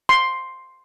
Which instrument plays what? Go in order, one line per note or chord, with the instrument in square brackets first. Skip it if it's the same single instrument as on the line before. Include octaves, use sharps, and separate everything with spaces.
[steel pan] C6